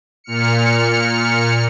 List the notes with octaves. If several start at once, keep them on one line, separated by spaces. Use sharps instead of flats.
A#2 F6 C#7